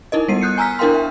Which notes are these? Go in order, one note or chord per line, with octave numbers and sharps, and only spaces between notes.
D#4 E4 A#4 D#5
G3 B3 C7 D#7
D#6 F#6 G6 C7 C#7
G#5 A#5 E6 F6 B6
D4 E4 A#4 F5 G5 C6
E5